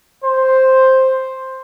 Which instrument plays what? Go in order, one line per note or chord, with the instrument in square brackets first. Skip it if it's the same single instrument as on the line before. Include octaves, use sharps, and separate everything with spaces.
[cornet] C5